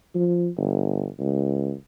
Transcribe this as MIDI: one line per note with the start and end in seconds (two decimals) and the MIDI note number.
0.15 0.50 53
0.57 1.07 31
1.19 1.73 37